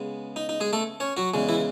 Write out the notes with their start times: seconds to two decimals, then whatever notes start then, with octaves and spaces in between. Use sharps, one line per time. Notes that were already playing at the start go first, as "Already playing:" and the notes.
Already playing: C#3 G#3 B3
0.36 D#4
0.49 D#4
0.60 G#3 G#4
0.73 A3 A4
1.00 C#4 C#5
1.17 F#3 F#4
1.34 E2 C#3 G#3
1.49 E3 E4